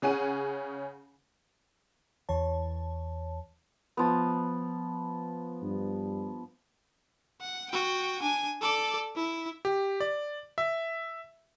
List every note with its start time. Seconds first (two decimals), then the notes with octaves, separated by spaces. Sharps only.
0.02 C#3 C#4 G#4 F#5 D#7
2.29 E2 E3 C#5 A5
3.97 F3 B3
5.62 G2
7.41 F#5
7.71 F#4 G5
8.22 D4 G#5
8.61 A4 D5
9.16 E4
9.65 G4
10.00 D5
10.58 E5